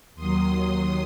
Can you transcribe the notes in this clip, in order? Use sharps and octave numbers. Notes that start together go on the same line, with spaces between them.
D#2 D#3 F#3 C6 D#6